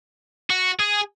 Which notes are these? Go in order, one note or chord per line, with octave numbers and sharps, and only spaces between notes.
F#4
G#4